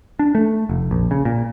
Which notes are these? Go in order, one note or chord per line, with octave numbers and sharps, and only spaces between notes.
D4
A3
F1
A#1
C#3
A#2